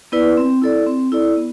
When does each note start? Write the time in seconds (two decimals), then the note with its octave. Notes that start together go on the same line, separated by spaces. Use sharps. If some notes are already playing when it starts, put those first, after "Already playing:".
0.12 B3 E4 B4 D5
0.37 C4
0.62 E4 A4 D5
0.86 C4
1.12 E4 A4 D5
1.37 B3